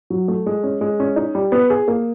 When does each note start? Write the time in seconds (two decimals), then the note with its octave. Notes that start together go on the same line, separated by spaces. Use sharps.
0.10 F#3
0.28 A3
0.46 G#3
0.63 C#4
0.81 G#3
1.00 C#4
1.16 D#4
1.35 G3
1.52 B3
1.70 G#4
1.88 A#3